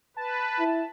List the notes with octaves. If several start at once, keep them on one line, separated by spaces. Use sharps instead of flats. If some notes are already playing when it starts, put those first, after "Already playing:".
B4 A5
E4